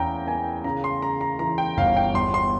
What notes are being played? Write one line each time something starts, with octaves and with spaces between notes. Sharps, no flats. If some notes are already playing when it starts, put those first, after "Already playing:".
Already playing: E2 A#3 C#4 G5 A#5
A#3 G#5
C#3 A#5
C6
C#3 A#5
A#5
E3 A#5
G5
G1 F5
G5
E2 C6
C6